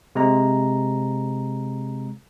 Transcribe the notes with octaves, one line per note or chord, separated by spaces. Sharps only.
C3 G#3 A#5